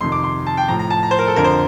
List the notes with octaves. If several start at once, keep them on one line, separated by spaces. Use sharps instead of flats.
F2 C3 D#3 C6
D6
C6
A5
G5
A2 F3 A#5
A#5
A5
A#5
C5
A#4
A4
F2 D3 F3 A#4
C5